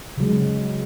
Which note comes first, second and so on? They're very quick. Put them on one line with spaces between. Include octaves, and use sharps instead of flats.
C#3 F#3 G#3